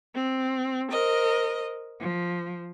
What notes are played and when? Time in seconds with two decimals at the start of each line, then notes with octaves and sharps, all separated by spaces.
0.15 C4
0.90 A#4 C5 D#5
1.99 F3